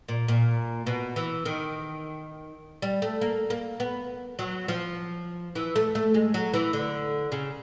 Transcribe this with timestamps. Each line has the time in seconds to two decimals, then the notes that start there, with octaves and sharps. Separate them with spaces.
0.08 A#2
0.28 A#2
0.87 B2
1.16 E3
1.45 D#3
2.82 G3
3.02 A3
3.21 A#3
3.50 A#3
3.80 B3
4.39 F#3
4.68 F3
5.55 E3
5.76 A3
5.95 A3
6.14 G#3
6.34 F#3
6.54 E3
6.73 D3
7.32 C#3